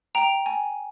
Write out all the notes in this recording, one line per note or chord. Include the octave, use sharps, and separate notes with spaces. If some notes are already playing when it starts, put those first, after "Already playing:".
G5 A#5
G#5